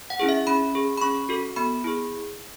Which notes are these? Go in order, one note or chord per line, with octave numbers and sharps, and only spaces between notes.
F#5
C#4 E4 G#4
E5
C#4 B5
G#4
B5
C#4 C#6
F#4 A4
B3 B5
E4 G#4